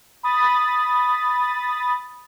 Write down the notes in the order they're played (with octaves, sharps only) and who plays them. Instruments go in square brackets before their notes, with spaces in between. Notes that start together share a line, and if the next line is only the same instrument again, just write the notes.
[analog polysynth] B5 D#6 A6